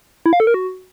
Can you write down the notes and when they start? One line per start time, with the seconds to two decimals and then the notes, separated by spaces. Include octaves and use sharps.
0.26 E4
0.33 F5
0.40 A4
0.47 A#4
0.54 F#4